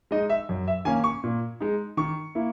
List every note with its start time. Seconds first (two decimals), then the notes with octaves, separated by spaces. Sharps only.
0.11 G#3 D#4 D#5
0.30 E5
0.49 F#2
0.68 E5
0.85 D#3 A#3 C#4 G#5
1.04 C#6
1.24 A#2
1.60 G#3 D#4
1.97 D#3 C#6
2.35 A#3 E4